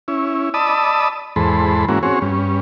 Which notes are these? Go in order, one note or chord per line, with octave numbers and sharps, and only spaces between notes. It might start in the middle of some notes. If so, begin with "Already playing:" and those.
C#4 E4
D5 D#5 A5 B5 D#6 E6
E2 G#2 A4 C5 B5
G#2 E3 A#3 C#4 F#4
C4 C#4 F#4 G#4 C#5
G2 C#4